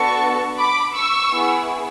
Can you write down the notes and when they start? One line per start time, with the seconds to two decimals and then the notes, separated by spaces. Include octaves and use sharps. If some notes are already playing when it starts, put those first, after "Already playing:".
Already playing: B3 D4 F#4 A4 A5 C#6
0.58 B5 D6
0.94 C#6 E6
1.30 B3 E4 G#4